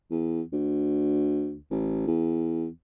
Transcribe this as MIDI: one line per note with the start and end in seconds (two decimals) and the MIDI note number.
0.11 0.41 40
0.53 1.57 38
1.71 2.02 33
2.07 2.67 40